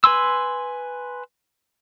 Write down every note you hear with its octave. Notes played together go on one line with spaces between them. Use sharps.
B4 G#5 C6 E6